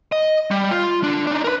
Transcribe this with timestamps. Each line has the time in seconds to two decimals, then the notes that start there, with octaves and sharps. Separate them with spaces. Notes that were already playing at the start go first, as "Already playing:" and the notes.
0.12 D#5
0.51 G3
0.71 F4
1.03 D3 D4
1.27 D4 D#4
1.44 A#4 B4